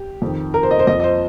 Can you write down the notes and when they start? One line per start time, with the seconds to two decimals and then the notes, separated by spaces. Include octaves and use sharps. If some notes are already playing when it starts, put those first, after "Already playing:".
Already playing: G4
0.22 F2 D#3
0.54 A#4
0.63 C5
0.71 D#5
0.79 C5
0.87 F2 F3 D#5
1.00 D#5
1.04 C5